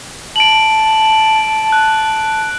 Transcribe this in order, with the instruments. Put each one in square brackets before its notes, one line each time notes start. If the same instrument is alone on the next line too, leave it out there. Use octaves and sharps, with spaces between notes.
[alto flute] A5 [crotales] D7 F#7
[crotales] F#6